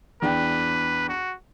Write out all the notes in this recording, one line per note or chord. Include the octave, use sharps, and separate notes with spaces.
E2 D4 B4 G5
F#4